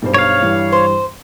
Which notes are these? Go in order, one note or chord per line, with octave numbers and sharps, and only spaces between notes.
B1 G2 C5
C#5 F5
G2 E3 G3
C5